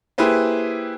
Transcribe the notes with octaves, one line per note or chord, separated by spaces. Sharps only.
A#3 E4 G4 G#4 B4 C5